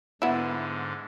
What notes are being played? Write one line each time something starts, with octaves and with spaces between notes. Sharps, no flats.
G#2 D3 B3 E4